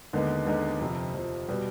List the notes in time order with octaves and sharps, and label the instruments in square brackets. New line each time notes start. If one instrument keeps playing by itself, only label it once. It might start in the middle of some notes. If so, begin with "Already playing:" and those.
[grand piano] D#2 D3 G#3 B3 D#4
D#2 D3 G#3 B3 D#4
F2 C3 F3
F2 C3 F3
B2 G3 B3